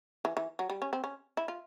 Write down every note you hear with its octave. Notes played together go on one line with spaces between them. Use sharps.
E3
E3
F#3
G3
C#4
C4
C#4
E4
F4